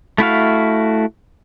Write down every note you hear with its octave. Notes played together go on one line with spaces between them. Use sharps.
A3 E4 F#4 F5